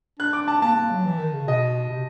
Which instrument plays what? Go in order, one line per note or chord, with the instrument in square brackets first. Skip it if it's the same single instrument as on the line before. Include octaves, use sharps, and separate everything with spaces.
[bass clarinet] D4 [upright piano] F#6
[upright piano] D6
A5
[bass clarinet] A#3 [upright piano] A5
[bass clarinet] A#3
F#3
E3
D#3
C#3
[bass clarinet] B2 [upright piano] D#5
[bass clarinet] C3